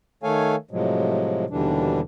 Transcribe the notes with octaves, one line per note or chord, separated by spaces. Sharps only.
D#3 A3 A4 C#5 F5 G#5
A2 C3 F3 F#3 G#3
D#2 B2 D3 E3 G3 D4